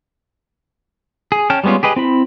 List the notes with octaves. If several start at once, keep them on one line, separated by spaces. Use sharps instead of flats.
G#4
C#4 G5 A5 F6
G3 G#3 B3 C#4 F4
G4 G#4 B4 D#5
C4 E4 B5